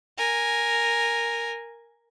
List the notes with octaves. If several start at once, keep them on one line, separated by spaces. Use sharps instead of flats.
A#4 G#5